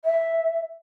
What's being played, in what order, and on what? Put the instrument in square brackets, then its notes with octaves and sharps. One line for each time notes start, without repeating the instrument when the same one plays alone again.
[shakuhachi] E5